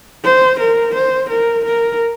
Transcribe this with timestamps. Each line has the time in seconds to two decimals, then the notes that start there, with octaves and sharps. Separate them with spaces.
0.24 C5
0.60 A#4
0.94 C5
1.29 A#4
1.65 A#4